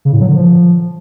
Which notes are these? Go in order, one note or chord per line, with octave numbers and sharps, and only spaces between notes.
C#3
A2
F#3
D3
F3